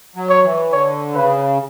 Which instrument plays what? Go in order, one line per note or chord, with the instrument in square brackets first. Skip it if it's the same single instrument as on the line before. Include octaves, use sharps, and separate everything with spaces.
[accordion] F#3
[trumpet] C#5
[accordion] E3
[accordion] D3 [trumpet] C#5
[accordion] C#3 [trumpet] B4